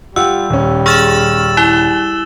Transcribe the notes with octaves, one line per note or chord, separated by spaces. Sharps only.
G3 F4 G4 F#5 E6
D#1 C#4
G#4 C#6 E6 F6 A6 E7
E4 G7